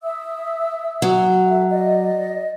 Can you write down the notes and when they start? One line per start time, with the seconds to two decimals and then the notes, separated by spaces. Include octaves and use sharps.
0.03 E5 D#6 E6
1.02 F#3
1.47 F#4 A4 E5
1.70 D5 D#5